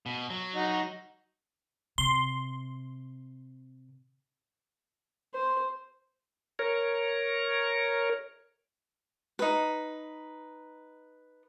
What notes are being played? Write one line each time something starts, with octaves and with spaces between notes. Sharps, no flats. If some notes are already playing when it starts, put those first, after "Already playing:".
B2
F#3
D#4 F#4
C3 C6
C5
A#4 C#5
D#4 B4